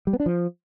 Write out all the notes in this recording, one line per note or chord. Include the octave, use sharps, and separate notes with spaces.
G3
B3
D4
F3